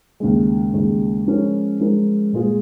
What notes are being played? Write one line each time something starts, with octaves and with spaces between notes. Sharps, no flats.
D#2 C#3 G#3
D#2 C#3 G#3
F3 G#3 C#4 A#4
F3 G#3 C#4 A#4
A#2 G#3 F4 G#4